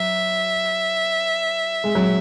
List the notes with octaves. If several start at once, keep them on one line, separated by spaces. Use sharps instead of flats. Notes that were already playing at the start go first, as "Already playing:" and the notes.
Already playing: F#3 E5
G#3
F#3